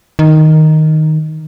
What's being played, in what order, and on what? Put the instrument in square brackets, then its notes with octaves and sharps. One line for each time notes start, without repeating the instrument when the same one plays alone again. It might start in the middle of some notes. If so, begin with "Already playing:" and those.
[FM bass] D#3